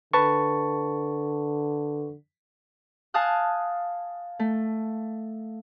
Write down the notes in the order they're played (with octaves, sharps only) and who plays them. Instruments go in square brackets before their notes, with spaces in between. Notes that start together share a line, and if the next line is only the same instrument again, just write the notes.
[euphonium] D3 [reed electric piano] B4 A5 C#6
[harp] F5 G#5 A5 D#6 F#6
A3